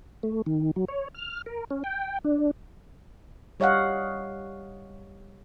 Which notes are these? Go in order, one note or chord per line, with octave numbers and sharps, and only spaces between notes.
A3
D#3
F#3
C#5
F6
A#4
C#4
G5
D4
G3 C#5 D#5 F5 F#5